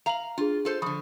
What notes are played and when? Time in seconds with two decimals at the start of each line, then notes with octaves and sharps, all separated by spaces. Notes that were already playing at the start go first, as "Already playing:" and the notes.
0.06 F5 A#5 F7 F#7
0.38 D4 F4 G#4
0.65 F4 A4 C5
0.82 D3 F3 B5 C#6 D#6